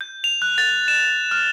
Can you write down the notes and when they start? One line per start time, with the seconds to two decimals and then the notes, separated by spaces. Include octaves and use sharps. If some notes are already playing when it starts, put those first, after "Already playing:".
0.01 G6
0.24 F7
0.42 F#6
0.58 A6
0.88 E7
1.31 F6